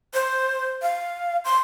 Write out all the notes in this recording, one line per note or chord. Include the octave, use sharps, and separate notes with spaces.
C5
F5
C6